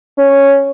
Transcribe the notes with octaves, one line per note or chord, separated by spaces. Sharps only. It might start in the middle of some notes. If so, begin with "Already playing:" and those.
C#4